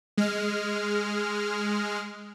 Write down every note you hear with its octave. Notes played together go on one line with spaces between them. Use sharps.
G#3 F6